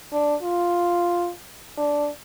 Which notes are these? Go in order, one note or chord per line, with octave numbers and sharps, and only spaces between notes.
D4
F4
D4